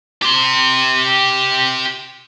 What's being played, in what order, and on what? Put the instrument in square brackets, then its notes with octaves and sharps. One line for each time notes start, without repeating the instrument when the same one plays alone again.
[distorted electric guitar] G4 C6